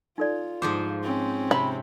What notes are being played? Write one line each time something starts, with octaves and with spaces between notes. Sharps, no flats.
D#4 F4 A4 D5
G#2 F3 C5 D6
C4 C#4
C3 B5